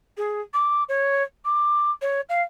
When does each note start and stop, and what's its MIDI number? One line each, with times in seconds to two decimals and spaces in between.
0.17 0.41 68
0.53 0.83 86
0.88 1.23 73
1.45 1.91 86
2.01 2.21 73
2.29 2.42 77